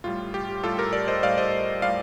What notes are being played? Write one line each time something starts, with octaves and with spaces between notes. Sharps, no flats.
A2 G3 F4
G4
A2 G3 F4 A4
G4 A#4
A#4 D5
C5 D#5
A2 G3 D5 F5
C5 D#5
A2 G3 D5 F5